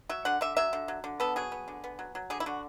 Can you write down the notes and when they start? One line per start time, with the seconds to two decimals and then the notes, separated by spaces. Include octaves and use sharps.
0.09 F#3 E5
0.25 D3 F#5
0.41 D3 E5
0.57 F#3 E5
0.73 D3
0.88 F#3
1.04 D3
1.20 B3 A4
1.36 F#3 G#4
1.52 B3
1.68 D3
1.84 B3
1.99 F#3
2.15 F#3
2.30 D3 G#4
2.40 E4
2.46 D3 F#4